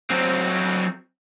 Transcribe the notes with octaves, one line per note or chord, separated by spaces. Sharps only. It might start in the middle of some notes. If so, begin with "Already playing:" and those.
F#3 C4